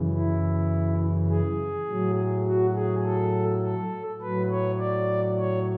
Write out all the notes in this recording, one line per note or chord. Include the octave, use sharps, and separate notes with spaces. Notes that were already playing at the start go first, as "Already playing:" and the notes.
Already playing: F#2 C#3 E3
E4
G#4
A2 F#3
F#4
G#4
A4
A4
A2 F#3 B4
C#5
D5
C#5